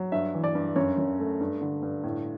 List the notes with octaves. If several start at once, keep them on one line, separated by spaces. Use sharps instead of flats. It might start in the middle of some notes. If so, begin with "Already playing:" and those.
Already playing: F#3
G2 E5
E3
D5
G2
F#2 C#5
F#2
A3
G2
D3
G2
A2